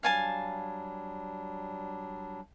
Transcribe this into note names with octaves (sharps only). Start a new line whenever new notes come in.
F#3 G3 D4 F5 G#5 A5